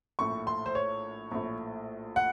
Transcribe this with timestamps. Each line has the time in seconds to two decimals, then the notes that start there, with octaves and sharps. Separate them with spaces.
0.19 A#1 A2 C#6
0.47 C6
0.66 C5
0.75 C#5
1.32 A#1 A2
2.16 F#5